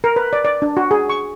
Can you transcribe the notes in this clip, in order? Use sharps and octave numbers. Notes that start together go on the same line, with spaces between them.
A#4
B4
D5
D5
D4
F#4
G#4
C#6